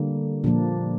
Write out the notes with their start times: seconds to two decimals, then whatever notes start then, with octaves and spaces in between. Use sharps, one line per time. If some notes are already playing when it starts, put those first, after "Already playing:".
Already playing: D3 G3 A#3
0.44 A#2 F3 A#3 D4